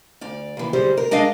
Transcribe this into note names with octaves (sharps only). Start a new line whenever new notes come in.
D2 D5 F5
D#2 E3
D2 G3 G#3 C5
A#4
G#3 D4 A#4 D#5 F5